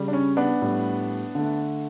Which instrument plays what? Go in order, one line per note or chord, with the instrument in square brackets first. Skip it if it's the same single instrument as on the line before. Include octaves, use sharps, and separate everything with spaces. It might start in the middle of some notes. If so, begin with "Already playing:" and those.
Already playing: [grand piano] C#3 G3
D4
C#4
B3 D4
A2 G3
D3 A3